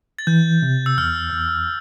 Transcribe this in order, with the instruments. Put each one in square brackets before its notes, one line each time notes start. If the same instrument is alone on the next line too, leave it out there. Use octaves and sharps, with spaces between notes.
[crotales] A6
[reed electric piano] E3 [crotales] G6
[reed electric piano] C3
[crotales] E6
[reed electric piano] E2 [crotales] F6
[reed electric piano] E2